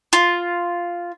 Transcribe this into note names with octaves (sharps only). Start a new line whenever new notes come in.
F4